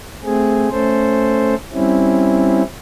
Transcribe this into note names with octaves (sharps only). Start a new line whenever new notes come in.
A3 C4 G#4
A3 C#4 A4 C5
G3 C4 C#4 E4